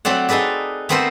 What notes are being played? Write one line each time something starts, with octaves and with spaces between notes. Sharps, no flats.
F#3 A3 C4 D5 F#5
D#4 G#4 A4 B4 D5
A3 B3 C4 A4 A#4 C5